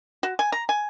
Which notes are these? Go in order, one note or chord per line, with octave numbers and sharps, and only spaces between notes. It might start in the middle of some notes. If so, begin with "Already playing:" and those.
F#4
G#5
A#5
G#5